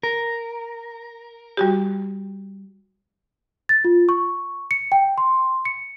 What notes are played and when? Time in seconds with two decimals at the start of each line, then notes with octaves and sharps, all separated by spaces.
0.03 A#4
1.57 G3 F#4 G4
3.69 A6
3.85 F4
4.09 C#6
4.71 C#7
4.92 G5
5.18 C6
5.65 C#7